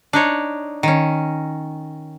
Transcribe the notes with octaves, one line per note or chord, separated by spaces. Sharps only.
D4 D#4 C#5
D#3 C#4